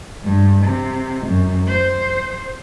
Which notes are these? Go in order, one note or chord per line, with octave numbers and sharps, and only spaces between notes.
G2
C3
F#2
C5